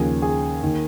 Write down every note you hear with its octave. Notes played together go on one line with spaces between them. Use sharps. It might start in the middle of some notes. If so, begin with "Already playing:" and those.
Already playing: D#2 C#3 F3 G#4
G#4
D#2 D#3